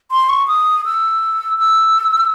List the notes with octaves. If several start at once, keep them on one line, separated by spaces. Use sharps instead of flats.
C6
C#6
D#6
E6
E6